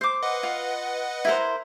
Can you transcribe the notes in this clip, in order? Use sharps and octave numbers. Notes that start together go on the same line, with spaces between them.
C5 D6
B4 D#5 F#5
F4
E4 A#4 C5